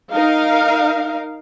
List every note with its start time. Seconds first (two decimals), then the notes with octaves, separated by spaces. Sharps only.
0.12 D#4 A#4 F5